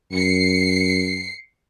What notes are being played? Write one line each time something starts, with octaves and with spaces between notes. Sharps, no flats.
F#2 C7 C#7